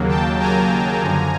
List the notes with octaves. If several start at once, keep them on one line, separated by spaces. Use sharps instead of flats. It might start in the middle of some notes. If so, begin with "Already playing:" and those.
Already playing: D#2 C#3 F#3 A#3
G5 A5
G#5 A#5
F#2 D3 F3